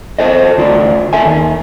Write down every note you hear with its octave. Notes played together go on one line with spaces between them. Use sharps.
A4 C5 D#5
D2 F4 D5
A4 E5 G#5
D#2